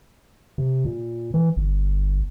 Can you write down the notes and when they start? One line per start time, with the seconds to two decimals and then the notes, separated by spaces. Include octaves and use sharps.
0.58 C3
0.85 A#2
1.34 E3
1.57 G1